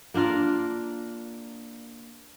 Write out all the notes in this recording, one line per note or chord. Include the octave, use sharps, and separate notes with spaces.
A#3 D4 F4 A#4